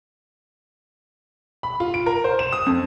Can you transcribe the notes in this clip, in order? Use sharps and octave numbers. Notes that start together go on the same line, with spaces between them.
B5
F4
D7
A#4
C5
E7
D#6
F2